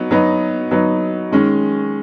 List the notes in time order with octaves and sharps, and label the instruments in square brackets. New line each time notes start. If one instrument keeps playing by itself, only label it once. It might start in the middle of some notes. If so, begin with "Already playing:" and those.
Already playing: [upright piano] F#3 B3 D#4
F#3 B3 D#4
F#3 B3 D#4
D#3 G#3 C#4